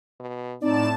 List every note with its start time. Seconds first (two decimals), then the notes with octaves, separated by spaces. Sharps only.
0.20 B2
0.62 A2 C4 D#4 D5 A5 E7